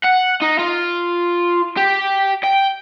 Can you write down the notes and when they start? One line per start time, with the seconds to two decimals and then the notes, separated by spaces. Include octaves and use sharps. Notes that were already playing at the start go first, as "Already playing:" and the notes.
0.04 F#5
0.41 D#4
0.59 F4
1.77 G4
2.44 G5